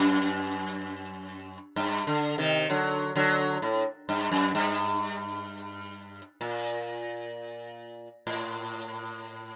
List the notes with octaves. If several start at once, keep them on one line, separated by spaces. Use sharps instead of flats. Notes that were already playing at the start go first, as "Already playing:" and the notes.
Already playing: F#2
G2
D3
C3 D#3
D3 F#3
D3 F#3
A2
G2
F#2
G2
A#2
A2